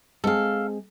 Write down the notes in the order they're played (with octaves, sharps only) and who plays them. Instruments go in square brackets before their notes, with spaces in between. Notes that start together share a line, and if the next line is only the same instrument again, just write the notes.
[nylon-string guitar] G#3 C4 G#4 [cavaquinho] A4 F5